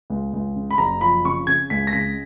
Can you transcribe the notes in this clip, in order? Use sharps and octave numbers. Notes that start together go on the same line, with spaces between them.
C#2
C#2
C#3
B5
F#1 A#5
F3 B5
C#3 C#6
C#3 G#6
C#2 B6
A#6
C#3 B6